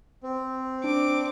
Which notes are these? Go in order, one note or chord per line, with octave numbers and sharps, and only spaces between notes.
C4
D4 D6